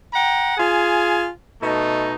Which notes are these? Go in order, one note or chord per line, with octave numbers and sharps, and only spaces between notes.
F#5 G5 A#5
F4 G#4 G#5
B2 A3 D#4